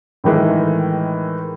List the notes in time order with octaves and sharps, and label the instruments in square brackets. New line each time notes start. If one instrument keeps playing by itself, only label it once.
[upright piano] A2 D#3 E3 G#3